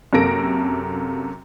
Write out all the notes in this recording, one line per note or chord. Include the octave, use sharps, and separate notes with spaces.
F#2 C3 A#3 A4 A#6 D7